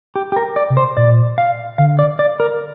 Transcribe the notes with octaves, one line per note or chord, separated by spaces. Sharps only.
G4
G4
A#4
D5
C3
C5
A#2 D5
F5
D3 F5
D5
D5
A#4